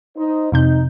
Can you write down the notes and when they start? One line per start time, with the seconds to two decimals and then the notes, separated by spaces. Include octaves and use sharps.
0.16 D#4 C5 D#5
0.52 F2 C3 D#4 G6